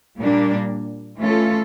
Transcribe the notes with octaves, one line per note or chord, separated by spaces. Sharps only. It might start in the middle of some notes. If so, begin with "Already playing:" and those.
A#2 G3 A#3 D4
E3 A3 C#4 F4 A4